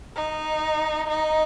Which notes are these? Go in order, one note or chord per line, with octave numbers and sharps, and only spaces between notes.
D#4
D#4